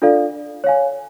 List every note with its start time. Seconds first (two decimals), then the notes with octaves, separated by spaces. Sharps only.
0.02 D4 F4 A4 D5 F5
0.64 C#5 F5 G#5